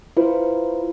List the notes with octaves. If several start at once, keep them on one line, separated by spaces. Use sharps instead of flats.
E4 F4 B4 C5